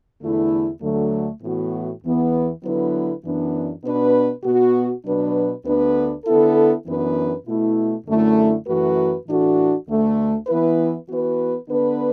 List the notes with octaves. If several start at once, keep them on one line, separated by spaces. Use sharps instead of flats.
E2 D3 A3 E4
D2 D3 F#3 A3
A2 E3 B3 F#4
E2 E3 B3
D3 F#3 B3 E4 B4
F#2 E3 B3 D4
B2 B3 D4 B4
B2 B3 F#4
B2 F#3 D4 B4
D2 D3 B3 D4 B4
D3 B3 E4 A4
F#2 E3 B3 D4 B4
B2 A3 E4
F#2 D3 A3 E4
F#2 E3 A3 F#4 B4
A2 E3 D4 F#4 A4
D2 D3 A3
E3 B3 E4 B4
E3 B3 F#4 B4
D3 B3 D4 B4